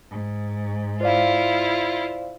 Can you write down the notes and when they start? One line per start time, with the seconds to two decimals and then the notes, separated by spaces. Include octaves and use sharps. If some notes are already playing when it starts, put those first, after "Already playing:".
0.11 G#2
1.01 E4 F4 C5 D5 F5